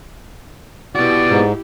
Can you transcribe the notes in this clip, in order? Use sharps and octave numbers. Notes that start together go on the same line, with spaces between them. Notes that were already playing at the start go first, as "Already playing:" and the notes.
B3 E4 F#4 G4 D5
G#2